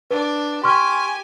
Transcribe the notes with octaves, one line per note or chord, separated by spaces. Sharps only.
D4 B4 D5
G4 G#5 C6 C#6 F6